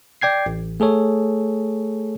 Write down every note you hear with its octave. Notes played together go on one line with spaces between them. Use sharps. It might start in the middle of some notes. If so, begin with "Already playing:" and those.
D5 G5 G#6 C7
A1
A3 G#4 A4 C#5